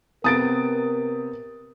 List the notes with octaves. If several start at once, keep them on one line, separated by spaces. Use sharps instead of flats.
C3 B3 A#4 D#6 A6 D7